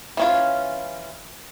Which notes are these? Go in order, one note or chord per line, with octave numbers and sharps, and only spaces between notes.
E3 C#4 F4